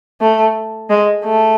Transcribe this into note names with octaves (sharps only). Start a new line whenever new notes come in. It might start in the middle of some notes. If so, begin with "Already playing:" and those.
A3
G#3
A3